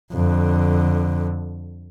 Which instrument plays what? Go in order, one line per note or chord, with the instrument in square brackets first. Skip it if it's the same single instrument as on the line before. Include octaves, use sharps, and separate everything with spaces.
[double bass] F2 D3